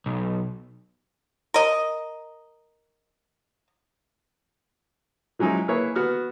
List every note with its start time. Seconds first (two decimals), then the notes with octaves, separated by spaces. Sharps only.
0.06 B1
1.54 A#4 D#5
5.39 F3 F#3 G#3 C#4 D#4 E4
5.68 A#3 E4 G#4 B4 C#5
5.96 B3 F#4 F6